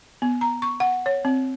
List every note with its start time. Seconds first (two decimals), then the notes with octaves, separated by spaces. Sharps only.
0.22 B3
0.41 A#5
0.62 C#6
0.80 F#5
1.06 C#5
1.25 C4